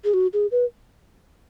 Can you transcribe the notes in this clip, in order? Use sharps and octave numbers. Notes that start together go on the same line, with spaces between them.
G#4
F#4
G#4
B4